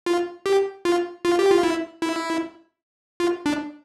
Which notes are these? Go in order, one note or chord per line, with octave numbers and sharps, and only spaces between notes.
F4
G4
F4
F4
G4
F4
E4
E4
F4
D4